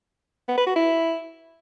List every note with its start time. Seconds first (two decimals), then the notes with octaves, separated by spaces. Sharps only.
0.49 B3
0.58 B4
0.67 F#4
0.76 E4